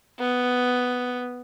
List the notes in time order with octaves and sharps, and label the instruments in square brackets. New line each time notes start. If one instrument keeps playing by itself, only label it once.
[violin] B3